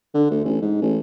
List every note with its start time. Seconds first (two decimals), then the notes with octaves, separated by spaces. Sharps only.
0.14 D3
0.31 D2
0.44 A1
0.61 G#2
0.81 A1